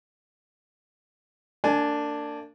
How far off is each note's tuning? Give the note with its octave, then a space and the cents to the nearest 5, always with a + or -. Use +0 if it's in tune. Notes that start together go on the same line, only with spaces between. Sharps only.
A#3 -40 D4 +0 G#5 +25